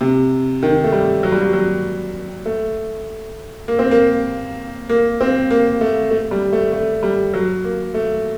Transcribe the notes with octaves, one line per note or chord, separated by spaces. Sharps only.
C3
D#3
A3
G3
F#3
G3
F#3
F#3
A3
A#3
C4
A#3
A#3
C4
A#3
A3
A3
G3
A3
A3
G3
F#3
A#3
A3